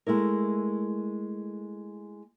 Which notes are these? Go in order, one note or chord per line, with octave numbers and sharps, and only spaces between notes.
G#3 A3 E4 A#4